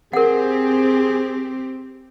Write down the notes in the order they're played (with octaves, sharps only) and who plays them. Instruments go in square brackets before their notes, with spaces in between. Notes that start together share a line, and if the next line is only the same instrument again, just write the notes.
[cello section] C4 G4 [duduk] G#4 [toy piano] A#4 F#5